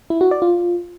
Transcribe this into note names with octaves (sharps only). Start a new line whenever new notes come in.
E4
F#4
D5
F4